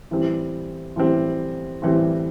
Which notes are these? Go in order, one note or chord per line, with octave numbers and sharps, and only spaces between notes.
A2 E3 G3 C4
A2 E3 G3 C4
A2 E3 G3 C4